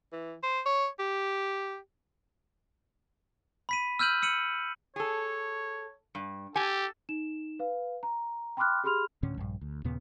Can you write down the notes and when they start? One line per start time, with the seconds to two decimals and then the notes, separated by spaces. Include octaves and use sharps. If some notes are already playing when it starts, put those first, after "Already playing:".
0.13 E3
0.43 C5
0.66 C#5
0.99 G4
3.69 B5 B6 D#7
3.99 E6 F6 G6 D#7 F#7
4.22 E6 C#7 D#7 F#7
4.96 G#4 A4 C#5
6.15 G2
6.56 G4 A4 G#5
7.09 D#4 E7
7.59 B4 F5
8.03 A#5
8.57 G5 B5 C6 D6 F6 F#6
8.84 G4 G#4 B5 C6 F6 F7
9.23 D2 A2 D3 C#4
9.38 A#1 G2
9.61 D2
9.84 D#2 A#2 C#3 B3